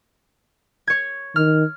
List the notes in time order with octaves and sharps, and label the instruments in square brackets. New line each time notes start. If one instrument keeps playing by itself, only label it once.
[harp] C#5 G#6
[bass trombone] D#3 [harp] F6